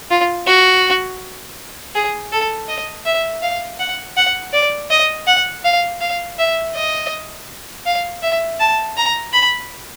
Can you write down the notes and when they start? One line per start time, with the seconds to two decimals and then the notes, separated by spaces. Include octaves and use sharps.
0.11 F4
0.47 F#4
1.95 G#4
2.32 A4
2.69 D#5
3.06 E5
3.42 F5
3.80 F#5
4.17 F#5
4.53 D5
4.90 D#5
5.27 F#5
5.65 F5
6.01 F5
6.38 E5
6.75 D#5
7.86 F5
8.23 E5
8.60 A5
8.97 A#5
9.33 B5